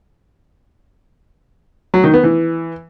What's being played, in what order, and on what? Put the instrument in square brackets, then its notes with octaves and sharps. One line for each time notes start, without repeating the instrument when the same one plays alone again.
[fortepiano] F#3
D#3
B3
E3